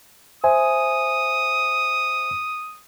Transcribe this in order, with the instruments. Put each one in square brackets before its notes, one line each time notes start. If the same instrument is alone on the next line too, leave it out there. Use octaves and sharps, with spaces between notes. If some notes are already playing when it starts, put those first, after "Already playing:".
[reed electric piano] C5 E5 G#5 [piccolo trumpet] D#6